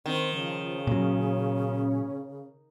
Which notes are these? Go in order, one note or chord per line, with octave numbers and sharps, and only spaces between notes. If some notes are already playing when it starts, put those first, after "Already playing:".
D#3 C4
C#3 F3
A#2 F#3 C#4